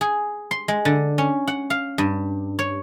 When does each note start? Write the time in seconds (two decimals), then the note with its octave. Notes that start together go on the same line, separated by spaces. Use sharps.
0.01 G#4
0.51 C6
0.68 G#3
0.85 D3
1.18 C#4
1.47 F#5
1.70 F5
1.98 G2
2.59 C#5